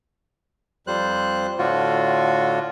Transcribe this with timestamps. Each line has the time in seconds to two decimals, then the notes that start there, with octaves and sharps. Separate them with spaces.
0.87 F2 G3 C5 F#6
1.58 A2 D3 F4 F#4